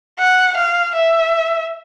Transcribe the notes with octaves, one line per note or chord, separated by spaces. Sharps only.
F#5
F5
E5